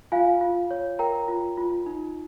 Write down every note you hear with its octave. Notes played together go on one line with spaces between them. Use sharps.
F4 F5 G#5
F4
C#5
A#4 G5 A#5
F4
F4
D#4